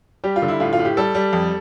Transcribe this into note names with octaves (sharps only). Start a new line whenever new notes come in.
G3 G4
F4
D3
E4
A2 F4
F4
A2
G4
G3 A4
G3
F2